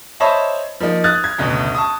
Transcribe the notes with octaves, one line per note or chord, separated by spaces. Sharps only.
C5 C#5 D#5 E5 A5 B5
F3 A#3 D#4
D#6 F6 F#6 G#6 A6
G#6
F#1 D2 B2
A5 C#6 D#6